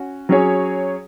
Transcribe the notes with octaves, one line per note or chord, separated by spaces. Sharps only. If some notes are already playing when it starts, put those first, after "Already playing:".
Already playing: C#4 F#4
F#3 C#4 G#4 C#5